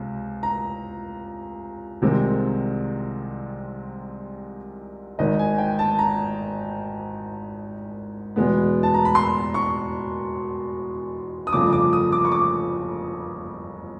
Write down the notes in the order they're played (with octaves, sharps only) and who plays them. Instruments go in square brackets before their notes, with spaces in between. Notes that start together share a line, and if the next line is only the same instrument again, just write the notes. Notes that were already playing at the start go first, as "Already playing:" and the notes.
Already playing: [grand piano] C#2 C3
A#5
C2 C3 D#3 G#3 C4
G#1 G#2 D#3 D#5
G#5
G5
A5
A#5
E2 B2 G#3 B3
A5
A#5
B5
C6
C#6
D#6
G1 F2 C#3 F3 A3 D6
D6
D#6
D6
C#6
D6